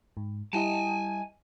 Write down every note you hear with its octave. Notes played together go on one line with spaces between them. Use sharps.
G#2
G3 E4 D#5 G#5 A5